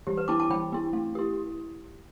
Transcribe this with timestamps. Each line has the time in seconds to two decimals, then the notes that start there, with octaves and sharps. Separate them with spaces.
0.07 E3 G4
0.17 B4
0.28 B3 E4 A5 D6
0.40 A5 D6
0.50 E3 G5 B5
0.72 B3 E4
0.93 A3
1.15 E4 G4